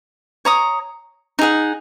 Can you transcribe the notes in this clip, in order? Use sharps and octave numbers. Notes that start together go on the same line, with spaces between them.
C#5 A#5 D#6
D#4 G#4 F#5